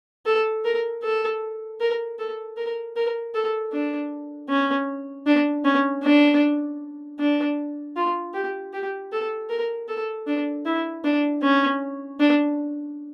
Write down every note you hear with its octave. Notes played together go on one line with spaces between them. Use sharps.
A4
A#4
A4
A#4
A4
A#4
A#4
A4
D4
C#4
D4
C#4
D4
D4
F4
G4
G4
A4
A#4
A4
D4
E4
D4
C#4
D4